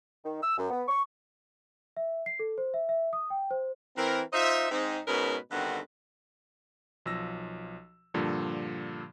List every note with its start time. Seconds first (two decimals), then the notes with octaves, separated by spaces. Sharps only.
0.24 D#3
0.42 E6
0.58 F#2
0.71 B3
0.88 C#6
1.97 E5
2.26 C7
2.39 A4
2.58 C5
2.74 E5
2.89 E5
3.13 D#6
3.30 G5
3.51 C5
3.97 E3 C4 A#4
4.33 D#4 F4 C5 D#5 E5
4.70 G#2 C4 D#4
5.06 G#2 B2 C#4 A#4 B4
5.51 G2 D3 D#3 B3 C4 F#4
7.06 B1 F3 E6 A#6
8.14 G2 A#2 D3 F3